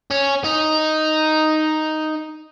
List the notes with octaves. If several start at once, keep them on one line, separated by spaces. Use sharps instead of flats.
C#4
D#4